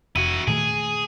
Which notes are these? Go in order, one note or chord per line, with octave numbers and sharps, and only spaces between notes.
F1 E4 F#4 D#7
A#2 D#3 A3 G#4